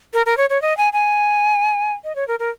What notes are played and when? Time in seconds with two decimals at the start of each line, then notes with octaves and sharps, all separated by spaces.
0.14 A#4
0.26 A#4
0.37 C#5
0.50 C#5
0.62 D#5
0.77 G#5
0.93 G#5
2.04 D#5
2.16 C#5
2.28 A#4
2.39 A#4